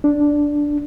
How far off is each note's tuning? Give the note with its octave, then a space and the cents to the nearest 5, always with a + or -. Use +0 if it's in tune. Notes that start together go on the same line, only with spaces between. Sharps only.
D4 -5